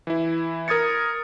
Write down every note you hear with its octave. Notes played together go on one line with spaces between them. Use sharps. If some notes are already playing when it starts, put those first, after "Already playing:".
E3 E4
A#4 D#6 G#6 A6 C#7